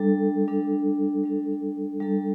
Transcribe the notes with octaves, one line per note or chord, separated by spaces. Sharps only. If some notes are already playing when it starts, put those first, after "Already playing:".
Already playing: G3 D4 A4
G3 D4 A4
G3 D4 A4
G3 D4 A4